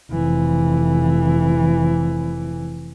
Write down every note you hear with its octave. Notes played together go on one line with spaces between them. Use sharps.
F1 E3